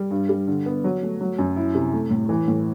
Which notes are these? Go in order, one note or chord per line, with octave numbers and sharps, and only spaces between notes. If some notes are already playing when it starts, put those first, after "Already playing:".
Already playing: G3
G2
G3
D3
B3
F#3
A3
F#3
F#2
E4
C3
A3
A2
E3
A2